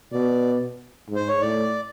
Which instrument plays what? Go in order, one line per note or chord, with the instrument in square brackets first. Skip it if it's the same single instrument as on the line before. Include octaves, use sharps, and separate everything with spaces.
[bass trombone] B2 [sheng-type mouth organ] D5
[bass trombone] G#2
[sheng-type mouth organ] C5
C#5
[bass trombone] A2 [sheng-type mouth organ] D5